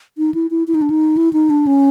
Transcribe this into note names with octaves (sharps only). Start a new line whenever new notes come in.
D#4
E4
E4
E4
D#4
D4
D#4
E4
D#4
D4
C#4